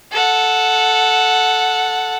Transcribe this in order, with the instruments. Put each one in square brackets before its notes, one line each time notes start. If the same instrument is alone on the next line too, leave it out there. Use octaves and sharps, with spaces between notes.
[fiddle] A4 F#5